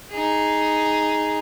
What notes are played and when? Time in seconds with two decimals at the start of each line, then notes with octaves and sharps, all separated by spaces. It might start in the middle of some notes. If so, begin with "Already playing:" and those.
0.12 D#4 G#4